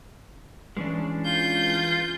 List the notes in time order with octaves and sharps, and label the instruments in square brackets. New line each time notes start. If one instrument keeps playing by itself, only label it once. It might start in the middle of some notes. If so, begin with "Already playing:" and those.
[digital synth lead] E3 [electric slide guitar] G#3 C#4 D4
[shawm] F4 [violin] G6